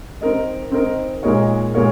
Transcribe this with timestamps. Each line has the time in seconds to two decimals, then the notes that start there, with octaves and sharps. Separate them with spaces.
0.21 C4 D#4 A#4 D#5
0.72 C4 D#4 A#4 D#5
1.23 A#2 G#3 D#4 A#4 C#5
1.74 A#2 G#3 D#4 A#4 C#5